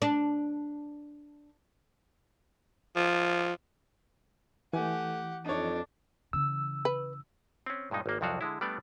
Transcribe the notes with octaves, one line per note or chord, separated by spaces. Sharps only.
D4
F3
E3 A3 G4 F#5 G#5
F2 D4 D#4 C#5
C#3 E3 E6
B4
C4 C#4
G2 A#2 G#3 D#4
G#1 A#3
C2 F2 F3 F#3 F#4 F5
D3 G#3 E4
G3 A3 B3 D4 D5